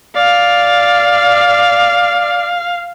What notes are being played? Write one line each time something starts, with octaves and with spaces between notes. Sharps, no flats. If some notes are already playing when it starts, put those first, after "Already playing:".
D5 F5